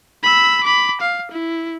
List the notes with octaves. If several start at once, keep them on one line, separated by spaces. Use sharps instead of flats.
B5 E6
B5 D6
F5
E4